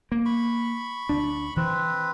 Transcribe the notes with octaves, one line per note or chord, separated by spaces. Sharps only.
A#3
B5 C#6
D2 D4
E3 C4 B4